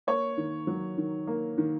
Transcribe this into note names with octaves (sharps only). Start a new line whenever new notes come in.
A#3 C#5
D#3
F#3
D#3
A#3
D#3